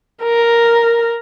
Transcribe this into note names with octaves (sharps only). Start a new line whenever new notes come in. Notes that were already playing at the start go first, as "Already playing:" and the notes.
A#4